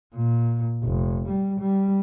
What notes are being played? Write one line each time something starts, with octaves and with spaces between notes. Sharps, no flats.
A#2
F1
G3
G3